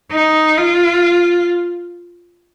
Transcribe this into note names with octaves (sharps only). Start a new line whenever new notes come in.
D#4
F4